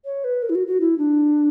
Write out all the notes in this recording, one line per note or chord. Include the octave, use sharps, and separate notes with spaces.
C#5
B4
A#4
E4
F#4
F#4
E4
D4